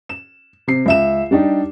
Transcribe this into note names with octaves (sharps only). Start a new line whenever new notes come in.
E7
C3 C7
C#2 E5 E7
G3 D4 D#4 G4